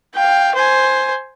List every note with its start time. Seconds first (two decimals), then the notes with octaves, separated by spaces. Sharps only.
0.15 F5 G5
0.55 C5 G#5